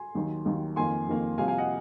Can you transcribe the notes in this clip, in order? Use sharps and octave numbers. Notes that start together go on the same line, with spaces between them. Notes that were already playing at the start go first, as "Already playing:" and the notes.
Already playing: G#5 C6
D#2 D#3 F#3
D#2 D#3 F#3
F2 D#3 A#3 G#5 C6
F2 D#3 A#3
C2 C3 F3 F5 G#5
F5 G#5
D#5 F#5